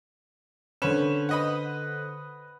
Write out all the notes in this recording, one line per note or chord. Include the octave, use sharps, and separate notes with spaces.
D3 C#4 B4 C5 E7
B4 D#5 F#5